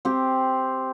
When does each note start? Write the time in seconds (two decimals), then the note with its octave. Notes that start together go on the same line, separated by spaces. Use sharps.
0.05 C4 G4